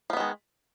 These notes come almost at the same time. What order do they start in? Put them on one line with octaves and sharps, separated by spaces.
F3 B3 D#3 G#3